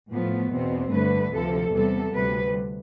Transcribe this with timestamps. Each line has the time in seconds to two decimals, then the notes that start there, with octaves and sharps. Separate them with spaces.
0.12 A2 F3 A3 B3
0.52 E2 B2 B3 C4
0.92 G2 D3 A3 B4
1.33 D2 C3 F3 A4
1.73 E2 C3 G3 B3 A4
2.13 D2 C3 G3 B4